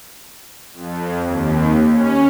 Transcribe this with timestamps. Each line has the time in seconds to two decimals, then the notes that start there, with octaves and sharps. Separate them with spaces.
0.74 F2
1.23 D#2
1.89 C#4